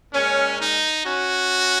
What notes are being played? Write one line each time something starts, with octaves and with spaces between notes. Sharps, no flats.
A#2 G#3 C#4
D#4
C#4 F#4